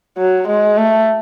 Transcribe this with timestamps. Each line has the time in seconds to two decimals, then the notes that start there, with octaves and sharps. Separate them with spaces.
0.18 F#3
0.48 G#3
0.77 A3